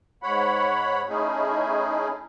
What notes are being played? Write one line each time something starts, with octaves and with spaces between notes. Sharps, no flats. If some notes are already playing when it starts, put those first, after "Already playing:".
G#2 C#5 F#5 B5
A3 C#4 D#4 E4 G#4